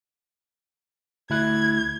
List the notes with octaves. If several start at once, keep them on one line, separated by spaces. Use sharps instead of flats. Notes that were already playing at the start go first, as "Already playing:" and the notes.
D2 E4 F#6 G#6